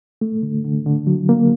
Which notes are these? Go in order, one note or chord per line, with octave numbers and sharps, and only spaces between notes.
A3
D3
D3
D3
F#3
A#3